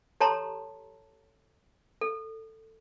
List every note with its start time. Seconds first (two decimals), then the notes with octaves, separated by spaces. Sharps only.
0.20 G4 A4 C#5 A5 A#5 C6
2.01 A4